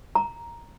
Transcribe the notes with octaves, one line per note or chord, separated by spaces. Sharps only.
A#5